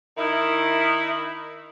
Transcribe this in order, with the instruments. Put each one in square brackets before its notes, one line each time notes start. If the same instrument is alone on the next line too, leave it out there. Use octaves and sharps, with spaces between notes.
[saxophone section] D#3 E4